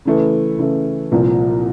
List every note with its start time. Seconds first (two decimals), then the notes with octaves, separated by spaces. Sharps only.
0.05 C#3 E3 A3
0.59 C#3 E3 A3
1.12 C2 A#2 F3